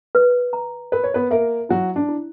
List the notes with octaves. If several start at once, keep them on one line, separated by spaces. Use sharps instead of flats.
B4
A#5
A#4 B4
C#5
B3 B4
A#3 A#4 E5
F#3 E4 F#4
D4
E4